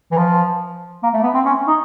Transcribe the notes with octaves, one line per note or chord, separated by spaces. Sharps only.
E3
F3
A#3
A3
B3
C4
C#4
D#4